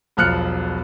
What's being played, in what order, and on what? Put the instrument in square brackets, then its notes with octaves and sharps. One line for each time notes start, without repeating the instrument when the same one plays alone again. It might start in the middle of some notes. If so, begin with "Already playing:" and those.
[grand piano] E1 B1 F3 F6 F#6 C#7